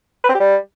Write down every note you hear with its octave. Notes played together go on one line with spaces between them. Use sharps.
B4
C4
G4
G3